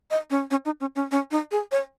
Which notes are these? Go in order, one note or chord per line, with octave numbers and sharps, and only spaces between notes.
D#5
C#4
C#4
D#4
C#4
C#4
C#4
D#4
G#4
C#5